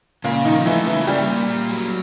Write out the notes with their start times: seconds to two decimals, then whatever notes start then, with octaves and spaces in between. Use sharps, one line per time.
0.24 A#2 C#3 A#3
0.45 D#3 F3 D#4
0.65 E3 A3 E4
0.86 C#3 E3 E4
1.07 G3 A#3 G4
1.28 A#2
1.49 A#3
1.70 F#3